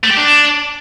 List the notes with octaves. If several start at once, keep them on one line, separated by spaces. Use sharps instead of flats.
A3
G4
D4